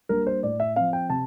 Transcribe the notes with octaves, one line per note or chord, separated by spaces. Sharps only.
G3 A#3 D4 A#4
C5
A2 D5
E5
F3 C4 F5
G5
C3 A5